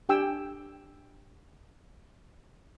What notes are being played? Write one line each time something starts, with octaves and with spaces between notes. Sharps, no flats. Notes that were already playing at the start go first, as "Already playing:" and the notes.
D4 G4 G5 G#5 E6